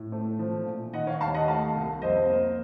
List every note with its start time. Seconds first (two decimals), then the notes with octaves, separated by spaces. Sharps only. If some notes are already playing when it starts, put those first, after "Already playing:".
Already playing: A2
0.12 A3
0.39 F3
0.66 A#2
0.93 D#3 D#5 F#5
1.07 C#5 F5
1.21 D#2 F5 A5
1.34 D#5 F#5
1.48 A3 F5 A5
1.75 C2
2.02 F2 C5 D#5
2.30 A#3